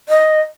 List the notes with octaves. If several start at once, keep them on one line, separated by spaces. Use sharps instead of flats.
D#5